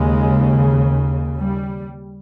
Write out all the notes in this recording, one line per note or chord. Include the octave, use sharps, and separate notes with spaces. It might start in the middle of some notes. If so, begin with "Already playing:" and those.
Already playing: D#2 C#3 G#3
G3